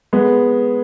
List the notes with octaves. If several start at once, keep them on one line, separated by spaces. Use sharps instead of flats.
G#3 B3